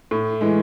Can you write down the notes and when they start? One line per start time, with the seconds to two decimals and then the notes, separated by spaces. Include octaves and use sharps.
0.11 A2
0.41 E3 G#3